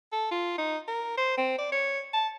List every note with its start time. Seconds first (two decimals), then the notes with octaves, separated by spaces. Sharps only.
0.12 A4
0.31 F4
0.58 D#4
0.88 A#4
1.17 C5
1.37 C4
1.58 D5
1.72 C#5
2.13 A5